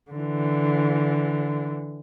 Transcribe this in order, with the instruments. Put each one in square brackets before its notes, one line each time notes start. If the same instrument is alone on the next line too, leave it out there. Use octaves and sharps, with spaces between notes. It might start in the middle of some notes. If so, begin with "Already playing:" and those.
[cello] D3 E3